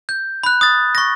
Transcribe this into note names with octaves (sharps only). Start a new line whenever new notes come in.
G6
B5 F#6
D#6 A6
C#6 A#6